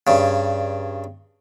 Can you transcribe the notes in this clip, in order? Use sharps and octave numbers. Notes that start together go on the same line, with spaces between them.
G2 C#3